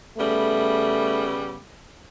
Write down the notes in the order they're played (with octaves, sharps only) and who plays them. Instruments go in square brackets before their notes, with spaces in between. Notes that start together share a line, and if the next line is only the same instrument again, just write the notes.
[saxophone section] C#3 G3 B3 [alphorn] A3